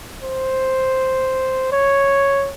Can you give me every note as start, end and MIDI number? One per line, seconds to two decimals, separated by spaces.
0.23 1.71 72
1.72 2.53 73